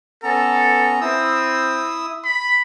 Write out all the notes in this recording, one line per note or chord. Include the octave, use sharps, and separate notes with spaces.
B3 C#4 A4 A#5
C4 E4 D#6 E6
B5